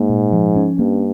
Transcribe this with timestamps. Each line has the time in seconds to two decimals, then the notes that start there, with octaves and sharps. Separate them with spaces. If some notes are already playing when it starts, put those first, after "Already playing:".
Already playing: G#2 A#3
0.09 A#2
0.32 F3
0.56 C#4
0.79 G2 A#3